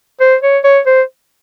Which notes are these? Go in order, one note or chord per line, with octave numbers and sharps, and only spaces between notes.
C5
C#5
C#5
C5